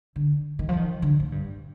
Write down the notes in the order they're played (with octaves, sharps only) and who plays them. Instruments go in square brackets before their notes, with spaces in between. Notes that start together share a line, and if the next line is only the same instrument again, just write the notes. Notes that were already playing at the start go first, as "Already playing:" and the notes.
[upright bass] D3
D#3
F3
D#3
D3
A2
G2